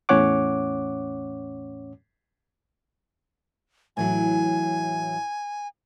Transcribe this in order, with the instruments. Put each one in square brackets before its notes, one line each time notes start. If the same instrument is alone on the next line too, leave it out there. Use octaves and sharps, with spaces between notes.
[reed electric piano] E2 A2 C#4 C#5 F#5 D6
[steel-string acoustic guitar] A2 E3 F#3 [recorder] G#5